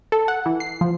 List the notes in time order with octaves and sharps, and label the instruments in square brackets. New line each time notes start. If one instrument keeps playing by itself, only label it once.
[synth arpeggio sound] A4
F#5
E3
C7
F3